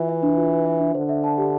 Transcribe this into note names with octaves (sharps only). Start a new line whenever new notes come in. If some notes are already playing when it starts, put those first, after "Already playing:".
Already playing: E3 F4 B4
E5
D4
F4
B4
E5
D4
D3 C5
E5
A5
G4